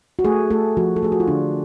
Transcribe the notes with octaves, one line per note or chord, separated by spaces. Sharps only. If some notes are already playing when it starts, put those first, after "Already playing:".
F#4
A3 G#4
A3 A4
F3 F#4
A4
A3 G#4
F#4
F4
D3 D4